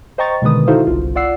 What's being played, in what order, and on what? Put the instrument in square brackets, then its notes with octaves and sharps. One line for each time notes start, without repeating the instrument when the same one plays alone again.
[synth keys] C5 D#5 G5 A#5 C#6 A6
B2 D3 D#3 G#3 B4 D#6
D#4 E4 F#4 A4 C5 F5
G1 C2 F4
F4 D5 F#5 E6 C7